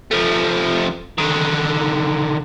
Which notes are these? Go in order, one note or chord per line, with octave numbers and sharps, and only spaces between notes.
F3 A3
D3 D#3